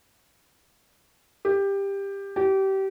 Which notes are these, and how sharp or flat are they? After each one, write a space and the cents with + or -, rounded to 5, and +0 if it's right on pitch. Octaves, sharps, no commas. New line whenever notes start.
G4 +15
G4 -25